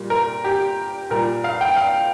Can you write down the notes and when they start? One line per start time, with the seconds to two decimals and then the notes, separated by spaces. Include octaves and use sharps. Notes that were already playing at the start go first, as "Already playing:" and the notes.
Already playing: A#2 G3
0.10 A#4
0.44 G4
1.10 A#2 G3 A#4
1.44 F5
1.61 G5
1.76 F5